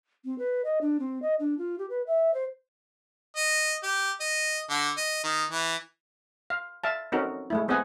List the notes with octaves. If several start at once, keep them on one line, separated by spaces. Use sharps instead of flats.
C4
B4
D#5
D4
C4
D#5
D4
F4
G4
B4
E5
C5
D#5
G4
D#5
D3
D#5
D#3
E3
F5
E5 F5 A5
C4 C#4 D#4 F#4 A4 A#4
G#3 A3 E4
B3 C4 G#4 D#5 F#5 G#5